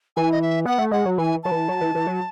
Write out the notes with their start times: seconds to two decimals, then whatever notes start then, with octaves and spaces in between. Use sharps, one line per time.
0.17 E3 G#5
0.32 D#5
0.42 E5
0.65 B3 F#5
0.78 A3
0.91 G#3 F#5
1.05 F#3
1.18 E3 G#5
1.43 F#3 A5
1.51 E3
1.68 F#3
1.81 E3
1.95 E3
2.07 F#3